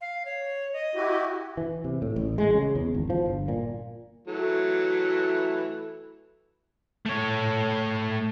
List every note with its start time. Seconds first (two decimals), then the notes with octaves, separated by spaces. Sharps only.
0.01 F5
0.25 C#5
0.73 D#5
0.95 E4 F#4 G4
1.57 E3
1.84 C3
2.02 A2
2.16 A1
2.38 G#3
2.54 C#3
2.75 E2
2.94 G#1
3.10 F3
3.26 G1
3.48 A#2
4.28 E3 F#3 A3
7.06 A3 C#5